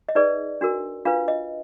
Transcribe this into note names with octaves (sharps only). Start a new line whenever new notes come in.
D#5
D#4 G#4 B4 D5
D4 F#4 A#4
D4 F4 B4 F5
D#5